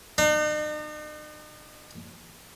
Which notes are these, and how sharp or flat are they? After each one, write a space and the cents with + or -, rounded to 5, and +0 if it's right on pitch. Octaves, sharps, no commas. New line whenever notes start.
D#4 -45